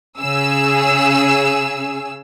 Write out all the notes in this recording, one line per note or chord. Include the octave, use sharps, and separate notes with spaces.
C#3 G#4 E6